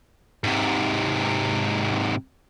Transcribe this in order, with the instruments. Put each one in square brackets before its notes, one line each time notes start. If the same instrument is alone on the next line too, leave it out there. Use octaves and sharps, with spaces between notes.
[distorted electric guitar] G#2 C3